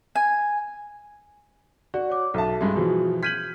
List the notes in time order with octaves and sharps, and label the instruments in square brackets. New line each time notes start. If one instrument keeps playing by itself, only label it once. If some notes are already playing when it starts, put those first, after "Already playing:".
[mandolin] G#5
[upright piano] F#4 [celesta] D5
[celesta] C#5 D6
[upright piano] B1 A5 [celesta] A4 E5
[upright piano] G2 G#3
[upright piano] B2 E3 F3 [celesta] F#4 G#4
[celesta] F6 G6 G#6 [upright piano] B6 D#7 F#7